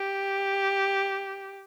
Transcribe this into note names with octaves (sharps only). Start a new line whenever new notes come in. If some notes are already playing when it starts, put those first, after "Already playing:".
Already playing: G4